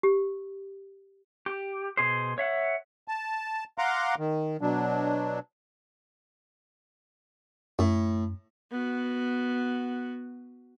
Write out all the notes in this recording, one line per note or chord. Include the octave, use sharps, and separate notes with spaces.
G4
G4
B2 G#4 C5
C#5 E5 F#5
A5
F5 F#5 A#5 C6 D6
D#3
B2 F#3 D4
F#2 A2
B3 F#4